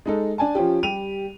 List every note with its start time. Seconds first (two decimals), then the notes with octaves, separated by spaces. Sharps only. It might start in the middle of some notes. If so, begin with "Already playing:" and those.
0.06 G#3 D#4 A4
0.38 D4 G#5 A5
0.55 F3 C#4 F4 G4
0.83 G3 G4 D#7 F7